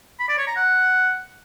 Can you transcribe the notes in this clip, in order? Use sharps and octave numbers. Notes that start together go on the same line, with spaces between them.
B5
D5
C#5
A#5
F#5